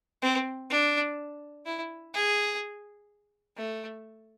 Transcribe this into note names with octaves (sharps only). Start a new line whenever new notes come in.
C4
D4
E4
G#4
A3